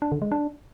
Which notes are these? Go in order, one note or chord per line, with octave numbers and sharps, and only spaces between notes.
D4
D3
G#3
D4